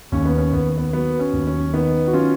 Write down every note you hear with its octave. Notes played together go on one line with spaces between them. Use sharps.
D#2 C#4
B3
C#4
D#2 B3
B3
F#3 B3
C#4
D#2
C#4
D#3 B3
F#4
F#3 C#4 F4